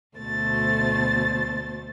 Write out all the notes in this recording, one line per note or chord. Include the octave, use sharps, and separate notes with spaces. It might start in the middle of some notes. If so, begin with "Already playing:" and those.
D2 B2 A3 C5 A6